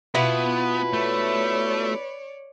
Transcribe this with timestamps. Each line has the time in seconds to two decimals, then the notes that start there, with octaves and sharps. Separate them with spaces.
0.15 B2 B3 E4 F4 B4
0.93 A3 C#5 D5